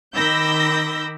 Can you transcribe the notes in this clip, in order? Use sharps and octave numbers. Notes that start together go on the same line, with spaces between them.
D#3 B5 D6 E6 G6 A#6